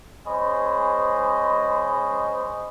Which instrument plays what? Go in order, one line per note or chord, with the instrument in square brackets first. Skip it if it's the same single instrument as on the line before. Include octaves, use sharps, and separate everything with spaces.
[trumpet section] G#3 C#4 C5 D#5 B5